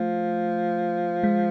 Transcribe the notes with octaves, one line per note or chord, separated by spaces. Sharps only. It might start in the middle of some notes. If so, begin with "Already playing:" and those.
Already playing: F3 A3
G#3